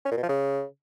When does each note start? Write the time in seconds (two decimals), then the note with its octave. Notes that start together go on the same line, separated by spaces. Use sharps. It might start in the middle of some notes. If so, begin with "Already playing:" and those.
0.06 C#4
0.11 A#2
0.17 B2
0.23 F3
0.29 C#3